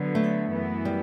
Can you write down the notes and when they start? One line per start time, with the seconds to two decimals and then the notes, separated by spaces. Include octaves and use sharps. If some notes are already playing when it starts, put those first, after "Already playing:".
Already playing: D3 F#3 B3
0.15 A3
0.50 F#2 E3 B3 E4
0.85 G3